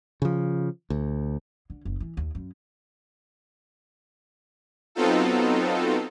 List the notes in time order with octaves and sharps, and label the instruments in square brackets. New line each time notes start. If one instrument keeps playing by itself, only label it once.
[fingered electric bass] C#3 F3
D2
[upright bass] D3
F#1
E3
D#2
F#2
[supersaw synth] F#3 B3 C4 D#4 F4 A4